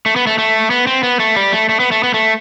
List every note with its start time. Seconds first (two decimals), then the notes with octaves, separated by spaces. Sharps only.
0.06 A3
0.16 B3
0.27 A3
0.38 A3
0.71 B3
0.87 C4
1.03 B3
1.20 A3
1.36 G3
1.52 A3
1.69 A3
1.80 B3
1.92 A3
2.04 B3
2.14 A3